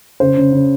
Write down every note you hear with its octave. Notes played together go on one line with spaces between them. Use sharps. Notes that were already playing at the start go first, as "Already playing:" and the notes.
C#3 C5
C#3
C#3